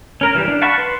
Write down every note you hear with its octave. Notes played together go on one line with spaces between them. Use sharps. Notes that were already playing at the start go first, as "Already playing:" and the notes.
C#4 A#4 A#5
E3 F3 G3
D4
F5 F#5 A5 B5 C#6
B4 C6